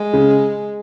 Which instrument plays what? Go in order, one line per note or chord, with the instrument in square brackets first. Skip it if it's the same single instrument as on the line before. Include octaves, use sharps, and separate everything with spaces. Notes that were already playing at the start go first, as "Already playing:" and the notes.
Already playing: [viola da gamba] G#3
[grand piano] C#3